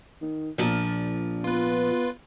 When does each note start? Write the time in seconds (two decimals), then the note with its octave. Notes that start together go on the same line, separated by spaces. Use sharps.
0.22 D#3
0.58 A#1 A#2 F3
1.44 B3 F4 B4